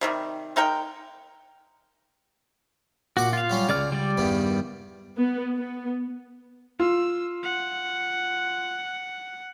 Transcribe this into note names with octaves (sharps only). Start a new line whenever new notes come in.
C3 D#3 F#3 G3
G#3 D#4 A#4 G5
A#2 F#4 F#5 D6
F4 F5
F#3 G3 C#4
C#2 C#3 D5 A#5 F6
G3 D5
E2 G2 D#3
B3
B3
F4 E6
F#5